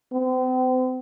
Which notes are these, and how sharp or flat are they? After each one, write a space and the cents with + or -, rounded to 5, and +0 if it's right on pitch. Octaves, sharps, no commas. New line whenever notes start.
C4 -40